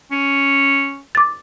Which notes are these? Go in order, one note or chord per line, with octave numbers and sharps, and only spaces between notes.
C#4
D6 A6